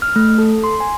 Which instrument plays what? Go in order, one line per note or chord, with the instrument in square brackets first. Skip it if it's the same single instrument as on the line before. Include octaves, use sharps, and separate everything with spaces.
[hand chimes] F6
A3
A4
C6
G#5